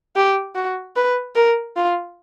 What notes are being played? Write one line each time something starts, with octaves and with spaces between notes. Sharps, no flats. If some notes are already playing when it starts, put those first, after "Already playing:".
G4
F#4
B4
A#4
F4